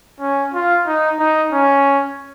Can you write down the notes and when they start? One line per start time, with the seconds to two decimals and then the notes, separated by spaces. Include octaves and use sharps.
0.20 C#4
0.53 F4
0.87 D#4
1.19 D#4
1.53 C#4